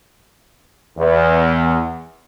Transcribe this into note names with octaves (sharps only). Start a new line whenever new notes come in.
E2